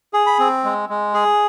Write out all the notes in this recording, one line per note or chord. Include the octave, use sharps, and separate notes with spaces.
G#4
B5
C4
G#3
G#3
G#4